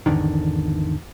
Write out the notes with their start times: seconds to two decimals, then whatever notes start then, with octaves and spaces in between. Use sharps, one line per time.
0.06 G#1 E2 D3 D#3